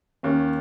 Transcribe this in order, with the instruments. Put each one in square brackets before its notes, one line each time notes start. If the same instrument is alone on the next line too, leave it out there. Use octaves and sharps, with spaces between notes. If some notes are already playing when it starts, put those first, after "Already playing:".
[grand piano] D#2 [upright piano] C#4